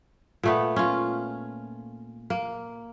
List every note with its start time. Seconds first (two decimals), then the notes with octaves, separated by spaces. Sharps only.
0.43 A#2 A3 B3
0.76 C#4 F4
2.30 A#3